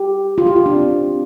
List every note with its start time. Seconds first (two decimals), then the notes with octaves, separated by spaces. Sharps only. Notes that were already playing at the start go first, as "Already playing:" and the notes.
Already playing: G4
0.38 F4
0.47 G4
0.56 F4
0.66 D4
0.75 C4